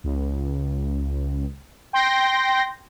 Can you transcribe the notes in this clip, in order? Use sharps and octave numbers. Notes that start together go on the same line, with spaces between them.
C#2
G5 C6 G6 A#6